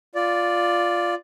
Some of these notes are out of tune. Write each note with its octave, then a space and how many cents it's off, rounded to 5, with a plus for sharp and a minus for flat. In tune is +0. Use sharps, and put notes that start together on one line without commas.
F4 +0 D5 +0